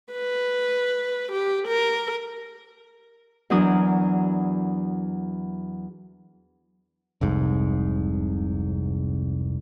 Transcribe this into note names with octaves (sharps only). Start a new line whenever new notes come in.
B4
G4
A#4
E2 F#3 D4 A#4 D#6
F1 C2 G#2